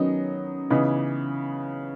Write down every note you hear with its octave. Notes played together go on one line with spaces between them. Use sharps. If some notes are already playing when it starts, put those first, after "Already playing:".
Already playing: D#3 F#3 B3 C#4 D#4
C#3 E3 B3 D#4